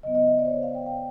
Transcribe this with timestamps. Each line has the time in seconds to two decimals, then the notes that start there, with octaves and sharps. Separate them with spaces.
0.03 C#3 F#3 B3 D#5
0.15 D#5
0.27 E5
0.39 D5
0.45 C5
0.50 C#5
0.63 F5
0.75 G5
0.86 G5